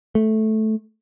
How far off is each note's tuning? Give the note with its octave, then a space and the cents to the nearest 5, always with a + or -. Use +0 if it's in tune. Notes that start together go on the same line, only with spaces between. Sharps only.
A3 -10